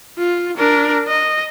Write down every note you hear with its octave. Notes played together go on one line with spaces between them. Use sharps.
F4
D4 A#4
D#5